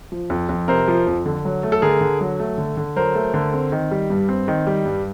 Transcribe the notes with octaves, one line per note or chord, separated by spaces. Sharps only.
F3
F2
F2
C3 A#4 C5
F3
F2
D3
F#3
A3
A4
D3 G#4 A#4
D3
F#3
A3
D3
D3
F#3 A#4 C5
A3
D3
C4
D#3
G3
G2
C4
D#3
G3
G2